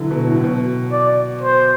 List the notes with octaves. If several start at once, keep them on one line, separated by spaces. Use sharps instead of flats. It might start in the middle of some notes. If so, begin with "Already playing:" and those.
Already playing: D3 E3 F#3
B2
A2
B2
D5
C5